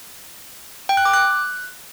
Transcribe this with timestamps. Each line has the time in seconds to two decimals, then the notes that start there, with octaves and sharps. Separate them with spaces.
0.89 G5
0.97 F#6
1.05 D6
1.14 F#6